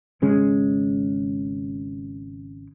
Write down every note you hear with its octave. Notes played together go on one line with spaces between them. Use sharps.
G#1 C#3 G#3 C#4